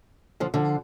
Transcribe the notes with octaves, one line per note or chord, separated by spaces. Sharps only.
D3 F3
D3 F3